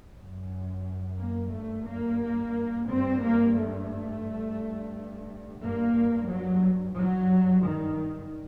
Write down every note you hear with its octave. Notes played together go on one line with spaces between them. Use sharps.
F#2
A#3
G2 A3
A#3
G2 C4
A#3
A3
G2
G2 A#3
F#3
G2 F#3
D#3